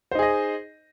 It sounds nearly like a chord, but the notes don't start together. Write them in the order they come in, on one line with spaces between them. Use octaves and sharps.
C5 D#4 G#4 D#5